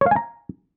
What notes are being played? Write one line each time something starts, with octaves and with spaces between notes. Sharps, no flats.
C#5
F5
G#5
A#5